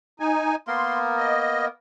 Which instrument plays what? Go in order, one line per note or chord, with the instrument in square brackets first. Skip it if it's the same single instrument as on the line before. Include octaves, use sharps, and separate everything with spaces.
[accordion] D#4 G#5
[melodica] A#3 B3 A#4 [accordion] C6
[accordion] D#5